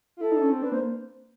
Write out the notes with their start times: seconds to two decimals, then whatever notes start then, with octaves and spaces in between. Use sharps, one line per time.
0.17 F4
0.21 E4 A4
0.31 D#4
0.37 D4
0.42 C#4
0.52 C4
0.62 D4 B4
0.72 A#3 C5